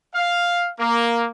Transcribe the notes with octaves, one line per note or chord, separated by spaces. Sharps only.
F5
A#3